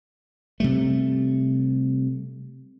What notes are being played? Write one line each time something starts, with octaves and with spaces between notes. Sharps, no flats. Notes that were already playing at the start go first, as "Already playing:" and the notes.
C3 G3 A3